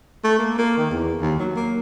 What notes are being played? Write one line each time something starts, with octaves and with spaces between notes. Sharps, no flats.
A3
A#3
A#3
D#3
E2
D#2
F#3
A#3